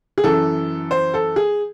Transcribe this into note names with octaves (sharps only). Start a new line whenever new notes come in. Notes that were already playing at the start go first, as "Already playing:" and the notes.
G#4
F#2 E3 A4
C5
A4
G#4